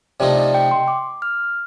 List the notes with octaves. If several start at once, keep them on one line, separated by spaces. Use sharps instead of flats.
C3 F3 A3 C4 D#4 D5
D#5
G5
C6
D6
F6